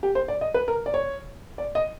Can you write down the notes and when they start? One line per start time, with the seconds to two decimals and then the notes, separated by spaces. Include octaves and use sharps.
0.03 G4
0.15 C5
0.28 D5
0.41 D#5
0.54 B4
0.68 A#4
0.86 D5
0.94 C#5
1.58 D5
1.75 D#5